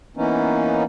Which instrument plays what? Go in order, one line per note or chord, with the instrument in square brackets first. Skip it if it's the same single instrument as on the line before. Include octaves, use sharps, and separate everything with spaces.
[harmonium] E3 A#3 B3 C#4 D#4